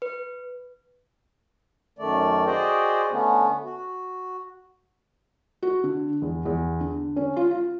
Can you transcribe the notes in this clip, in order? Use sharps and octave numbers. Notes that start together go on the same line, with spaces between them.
B4
F#2 D#3 A3 D5
F#4 G#4 C5 D5 D#5 G5
D3 A3 B3 C#4
F#4
F#4
D3
E2
E2
D3
C#4
F4
F4